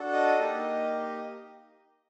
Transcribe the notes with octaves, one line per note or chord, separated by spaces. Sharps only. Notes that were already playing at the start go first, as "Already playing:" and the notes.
Already playing: D4 F#4 A4
D#5
A#3 D#4 G4